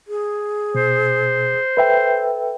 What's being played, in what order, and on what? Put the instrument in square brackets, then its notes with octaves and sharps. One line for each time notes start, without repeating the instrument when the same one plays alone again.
[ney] G#4
[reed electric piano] B2 [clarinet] C5
[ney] A4 [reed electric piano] B4 E5 G5